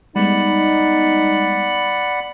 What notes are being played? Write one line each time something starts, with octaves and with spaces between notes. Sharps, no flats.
G3 G#3 B3 D#4 D5 F#5 B5